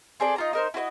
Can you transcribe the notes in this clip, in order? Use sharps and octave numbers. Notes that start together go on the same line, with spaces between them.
C4 G#4 A4 D5
D#4 F4 A#5
D#4 A#4 C5
E4 F#4 C5 D#5